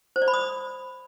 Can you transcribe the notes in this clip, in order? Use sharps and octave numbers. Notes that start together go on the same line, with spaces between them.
C5
D5
B5
D#6